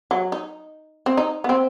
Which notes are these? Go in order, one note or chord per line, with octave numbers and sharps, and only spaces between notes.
F#3
D#4
C4
D#4
B3
C4